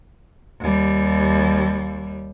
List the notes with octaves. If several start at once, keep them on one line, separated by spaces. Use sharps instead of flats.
D#2 G3